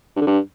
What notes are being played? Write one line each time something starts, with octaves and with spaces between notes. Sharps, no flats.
G2
D3
G2